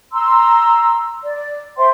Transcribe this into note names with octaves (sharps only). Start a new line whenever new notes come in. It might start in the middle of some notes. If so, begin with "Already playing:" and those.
A#5 C6 E6
D5
C5 E5 G5 C6